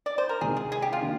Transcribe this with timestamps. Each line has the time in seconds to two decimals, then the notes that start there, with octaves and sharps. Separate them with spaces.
0.06 D5
0.18 C5
0.29 A#4
0.41 C3 D#3 G#3 G#4
0.57 G#4
0.72 G#4
0.82 G4
0.93 F4
1.02 D#3 A#3 D4